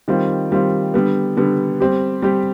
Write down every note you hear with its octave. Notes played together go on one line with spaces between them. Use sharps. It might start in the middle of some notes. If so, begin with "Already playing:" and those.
D#3 G3 C4 F4
D#3 G3 C4 F4
D3 G3 B3
D3 G3 B3
G3 C4 G4
G3 C4 G4